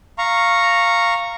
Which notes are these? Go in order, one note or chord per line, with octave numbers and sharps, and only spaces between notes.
F5 A#5 C#6